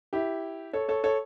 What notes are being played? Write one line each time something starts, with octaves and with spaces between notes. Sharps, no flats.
E4 G4
A4 C#5
A4 C#5
A4 C#5